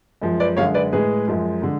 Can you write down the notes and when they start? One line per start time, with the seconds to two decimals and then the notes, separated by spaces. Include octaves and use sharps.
0.22 F#2 F3 G#3
0.40 B4 D5
0.57 F#2 D3 G#3 C#5 F5
0.74 B4 D5
0.93 A2 G#3 G#4 B4
1.28 F#2 F3 G#3
1.62 D3 G#3